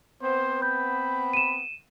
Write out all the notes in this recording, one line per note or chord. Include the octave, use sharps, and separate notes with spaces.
B3 C4 C5
B5 G6
D#7 E7